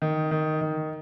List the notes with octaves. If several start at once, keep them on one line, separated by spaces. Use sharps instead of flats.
D#3
D#3
D#3